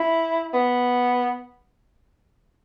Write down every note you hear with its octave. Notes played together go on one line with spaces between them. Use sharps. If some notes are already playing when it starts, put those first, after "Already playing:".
Already playing: E4
B3